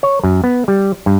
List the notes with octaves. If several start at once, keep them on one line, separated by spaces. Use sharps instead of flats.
C#5
F#2
B3
G3
G2